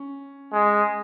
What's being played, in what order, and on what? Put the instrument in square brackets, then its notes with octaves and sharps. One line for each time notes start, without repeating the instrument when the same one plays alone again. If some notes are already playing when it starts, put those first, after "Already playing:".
Already playing: [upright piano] C#4
[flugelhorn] G#3